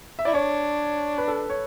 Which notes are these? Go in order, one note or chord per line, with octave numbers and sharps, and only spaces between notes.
E5
E4 D5
D4 C#5
B4
A4
C#5